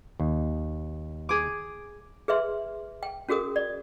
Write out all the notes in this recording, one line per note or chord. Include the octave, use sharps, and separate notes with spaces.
D#2
G#4 D6
G#4 B4 E5 C6
G5
C#4 F#4 G#4 A#4 D#6
D5